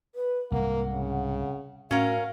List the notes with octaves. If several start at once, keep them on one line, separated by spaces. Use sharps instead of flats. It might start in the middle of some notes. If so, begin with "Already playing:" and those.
B4
C2 G#2 A#3 F#5
C#3
A2 C#4 F#4 A#4 F5